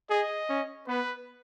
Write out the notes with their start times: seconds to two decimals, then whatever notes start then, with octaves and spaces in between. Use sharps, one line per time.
0.10 G#4 D#5
0.49 C#4
0.87 B3 B4